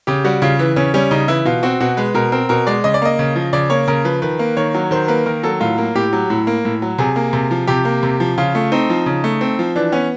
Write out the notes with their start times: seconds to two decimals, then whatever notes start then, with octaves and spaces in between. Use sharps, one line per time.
0.07 C#3 G4
0.24 G3 F#4
0.42 C#3 F4
0.59 E3
0.76 C#3 C#4
0.94 G3 C#4
1.11 C#3 D#4
1.28 E3 E4
1.45 B2 F4
1.63 C4 F#4
1.80 B2 F#4
1.97 G#3 B4
2.14 B2 A#4
2.32 C4 A#4
2.49 B2 A#4
2.67 G#3 D5
2.84 C#3 D#5
2.94 D5
3.02 A#3 D#5
3.19 C#3
3.36 F3
3.53 C#3 D5
3.70 A#3 C#5
3.87 C#3 A#4
4.05 F3 B4
4.22 D#3 B4
4.39 A#3
4.57 D#3 C#5
4.75 F#3
4.91 D#3 C5
5.08 A#3 B4
5.26 D#3 A#4
5.43 F#3 A4
5.61 A2 F4
5.78 A#3
5.95 A2 G4
6.13 F#3
6.30 A2
6.47 A#3
6.65 A2
6.82 F#3
6.98 C3 G#4
7.16 A#3
7.33 C3
7.51 F3
7.68 C3 G4
7.85 A#3
8.03 C3
8.20 F3
8.38 C#3 F4
8.55 A3
8.72 C4 D#4
8.90 F3
9.06 C#3
9.24 A3
9.41 C4
9.59 F3
9.76 E3 D4
9.92 B3 C#4